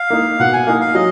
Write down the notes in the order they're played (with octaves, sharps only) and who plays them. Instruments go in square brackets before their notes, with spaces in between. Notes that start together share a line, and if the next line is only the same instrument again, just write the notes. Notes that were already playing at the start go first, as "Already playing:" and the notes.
Already playing: [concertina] F5
[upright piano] A#3 D#4
[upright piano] B2 [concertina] F#5
[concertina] G#5
[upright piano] A#3 D#4 [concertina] F5
[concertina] F5
[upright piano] F#3 [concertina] D#5